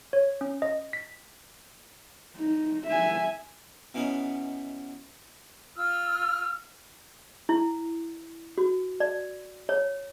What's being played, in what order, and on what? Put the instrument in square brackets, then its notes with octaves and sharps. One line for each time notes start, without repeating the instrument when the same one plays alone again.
[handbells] C#5
C#4
D#5
B6
[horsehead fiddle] D#4
E5 G#5
[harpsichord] B2 E3 B3 C#4 D#4
[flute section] F4 E6 F6
[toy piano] E4
F#4
D5
C#5